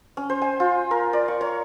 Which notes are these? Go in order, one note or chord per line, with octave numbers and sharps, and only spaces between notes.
C#4
C5
G#5
F4
A#4
D5
C#6
C#5